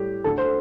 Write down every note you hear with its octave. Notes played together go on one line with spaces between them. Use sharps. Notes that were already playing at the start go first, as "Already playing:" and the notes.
Already playing: A2 G3 G4
D2 D3 A3 A4
C5